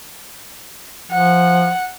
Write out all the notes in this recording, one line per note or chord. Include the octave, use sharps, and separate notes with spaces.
F3 F#5